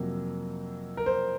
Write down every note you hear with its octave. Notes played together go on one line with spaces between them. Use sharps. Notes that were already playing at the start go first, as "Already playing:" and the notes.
Already playing: F2 C3 F#3 A#3
A#4
C5